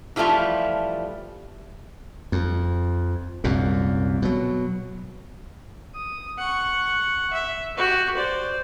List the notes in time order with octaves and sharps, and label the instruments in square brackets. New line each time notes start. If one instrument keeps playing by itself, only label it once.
[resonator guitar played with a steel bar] E3 F3 G3 A3 F4
[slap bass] F2
C2 F#2 A#2
B2 F#3
[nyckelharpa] D#6
F#5 C#6
E5
F#4 G4
C5 D5